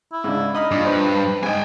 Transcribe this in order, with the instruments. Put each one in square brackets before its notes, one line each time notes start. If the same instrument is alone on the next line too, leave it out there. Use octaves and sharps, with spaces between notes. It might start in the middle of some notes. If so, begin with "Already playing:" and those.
[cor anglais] E4
[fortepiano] G#2 C#3 D4
[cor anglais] D#4 [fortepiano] D#5 B5 F6
[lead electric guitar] G2 [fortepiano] A#2 D4
[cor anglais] B4 [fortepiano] C5
[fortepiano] G#2 D#5 [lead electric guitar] G5 G#5